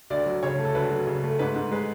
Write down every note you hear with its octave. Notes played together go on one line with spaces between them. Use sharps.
D2 D5
F#3
C#3 C#5
A3
A4
D2 B4
F#3
C#3
A3
G#2 B4
G#2
G#3 B4